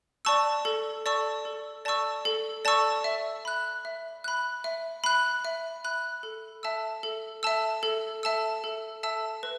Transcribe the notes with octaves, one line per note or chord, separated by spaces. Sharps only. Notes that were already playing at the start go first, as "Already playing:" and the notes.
D5 A5 C#6 E6
A4
D5 A5 C#6 E6
A4
D5 A5 C#6 E6
A4
D5 A5 C#6 E6
E5
B5 F#6
E5
B5 F#6
E5
B5 F#6
E5
B5 F#6
A4
E5 A5 E6
A4
E5 A5 E6
A4
E5 A5 E6
A4
E5 A5 E6
B4